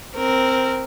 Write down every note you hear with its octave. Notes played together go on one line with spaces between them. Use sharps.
C4 A#4